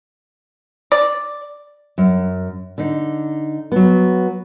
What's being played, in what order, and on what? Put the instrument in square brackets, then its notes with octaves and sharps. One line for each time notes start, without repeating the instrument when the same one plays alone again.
[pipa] D5
[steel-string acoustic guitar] F#2
D3 D#4
F#3 B3